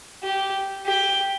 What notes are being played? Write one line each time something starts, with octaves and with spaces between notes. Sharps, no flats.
G4
G4